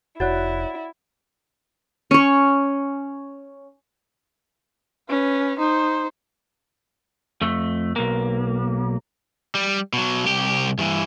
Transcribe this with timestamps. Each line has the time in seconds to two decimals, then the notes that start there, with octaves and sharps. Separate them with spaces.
0.20 F1 E4 F#4 C#5 D5 F#5 F#6 A6
2.11 C#4 C#5
5.09 C#4 B4
5.59 D#4 C5
7.42 F2 A3
7.96 B1 A#3
9.55 G3
9.93 B2 F#3
10.25 C2 G4
10.78 G2 E3